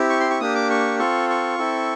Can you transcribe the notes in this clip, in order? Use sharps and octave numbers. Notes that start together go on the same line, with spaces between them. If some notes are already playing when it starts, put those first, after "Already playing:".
Already playing: C4 E4 G4
C#6
C6
C#6
A#3 D4 G4 D#6
D6
C#6
C4 F4 A4 C#6
C#6
C4 E4 A4